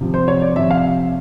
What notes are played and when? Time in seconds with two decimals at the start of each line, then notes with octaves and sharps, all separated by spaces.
0.01 C3 F3
0.14 C5
0.28 C#5
0.42 D5
0.56 C3 F3 E5
0.70 F5